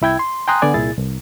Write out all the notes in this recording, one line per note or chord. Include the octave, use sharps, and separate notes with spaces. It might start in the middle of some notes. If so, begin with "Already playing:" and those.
C2 E4 G5 G#6
C6
G5 G#5 A#5 C6 D#6 F#6
D3 B3 D5 G#5
C2 A#2 E4 G#4 A6
C2